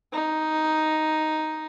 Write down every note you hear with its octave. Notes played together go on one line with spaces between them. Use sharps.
D#4